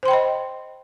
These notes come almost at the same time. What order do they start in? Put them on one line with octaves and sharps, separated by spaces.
C5 C6 G5 B5 D#5